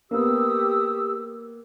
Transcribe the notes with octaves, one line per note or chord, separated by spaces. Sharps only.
A#3 B3 G4 D#6 E6